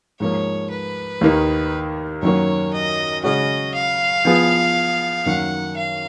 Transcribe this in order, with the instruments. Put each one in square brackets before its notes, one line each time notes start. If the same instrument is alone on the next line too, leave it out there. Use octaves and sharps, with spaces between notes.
[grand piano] G#2 F3 A#3 [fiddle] C#5
[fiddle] B4
[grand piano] D#2 D#3 A#3 D#4
[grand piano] F#2 D#3 F#3 A#3 [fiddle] C#5
[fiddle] D#5
[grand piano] C#3 G#3 C#4 F#4 [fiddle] D#5
[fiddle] F5
[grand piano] F3 B3 F4 G#4
[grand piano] F#2 D#3 A#3 [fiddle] F#5
[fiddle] F5